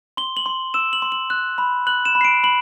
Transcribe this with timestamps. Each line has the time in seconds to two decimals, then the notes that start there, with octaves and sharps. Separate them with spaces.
0.17 C6 G7
0.37 F#7
0.46 C6
0.74 E6 E7
0.93 F#7
1.02 C6
1.12 F#7
1.30 F#6
1.58 B5
1.87 F#6 F#7
2.05 E7
2.15 B5
2.21 C7
2.25 D7
2.44 B5 F#7